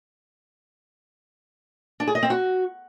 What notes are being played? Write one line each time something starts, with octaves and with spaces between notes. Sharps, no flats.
D4
G#4
D#5
C4
F#4